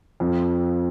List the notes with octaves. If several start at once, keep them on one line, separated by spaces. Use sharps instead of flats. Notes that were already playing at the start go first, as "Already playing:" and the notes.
F2